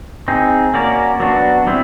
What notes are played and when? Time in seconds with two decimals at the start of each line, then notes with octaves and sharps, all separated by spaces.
0.28 C4 D#4 G#4
0.74 A#3 C#4 F#4 A#4 D5
1.20 F#3 B3 D4 F#4
1.67 G3 C4 E4